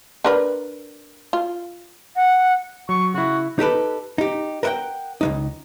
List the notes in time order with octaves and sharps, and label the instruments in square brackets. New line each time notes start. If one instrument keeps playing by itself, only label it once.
[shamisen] D4 A#4 B4
F4
[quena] F#5
[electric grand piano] F#3 [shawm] C#6
[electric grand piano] C#3 E4 [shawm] F#4
[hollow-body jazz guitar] D#4 G4 A4 B4
D#4 G4
A#4 B4 E5 F#5 G5
C#2 G#3 D#4